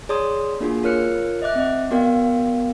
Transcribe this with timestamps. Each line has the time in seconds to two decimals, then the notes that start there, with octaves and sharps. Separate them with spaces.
0.09 G#4 C#5 D5 A#5 C6 D#6
0.60 A#3 D4 F4 F#4 G#4
0.83 F4 A#4 C#5 F6 F#6 C#7
1.42 D#5 E5 D6 F#6
1.55 C4 D#5
1.91 B3 F#4 A#4 D5 F5 G5